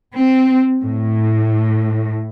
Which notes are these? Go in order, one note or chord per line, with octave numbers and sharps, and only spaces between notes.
C4
A2